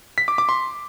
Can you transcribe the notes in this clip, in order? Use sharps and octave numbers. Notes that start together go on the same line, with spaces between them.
B6
D6
D6
C6